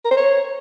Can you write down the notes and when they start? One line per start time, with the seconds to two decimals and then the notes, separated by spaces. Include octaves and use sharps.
0.05 A#4
0.11 C5
0.17 C#5